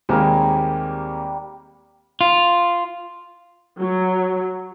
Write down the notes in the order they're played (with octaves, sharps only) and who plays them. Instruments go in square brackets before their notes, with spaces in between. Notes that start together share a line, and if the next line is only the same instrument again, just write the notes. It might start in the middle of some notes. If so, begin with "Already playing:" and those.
[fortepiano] D#2 G#3 C4 [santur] G3 A#3 G4
[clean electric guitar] F4
[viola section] F#3